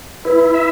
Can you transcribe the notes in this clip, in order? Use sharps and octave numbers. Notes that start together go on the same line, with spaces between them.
E4 B4
E5